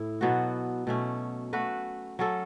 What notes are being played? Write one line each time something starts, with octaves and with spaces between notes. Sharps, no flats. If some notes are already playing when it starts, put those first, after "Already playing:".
Already playing: A2 E4
B2 F#3 B3 F#4
B2 A3 C#4
A3 F#4 B4
F#3 C#4 A4